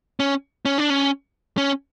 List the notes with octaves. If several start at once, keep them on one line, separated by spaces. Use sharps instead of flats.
C#4
C#4
D4
C#4
C#4